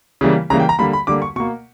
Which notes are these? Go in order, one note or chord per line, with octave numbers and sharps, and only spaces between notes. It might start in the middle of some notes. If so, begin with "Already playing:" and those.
C#3 E3 G3 A#3
C#3 E3 G3 A#3 A#5
G5
A#5
D3 G3 A#3 B5
B5
D3 G3 A#3 D6
C#6
B2 A#3 C#6